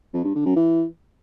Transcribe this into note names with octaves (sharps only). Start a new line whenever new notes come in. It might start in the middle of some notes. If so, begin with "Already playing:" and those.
F2
G2
D3
F#2
E3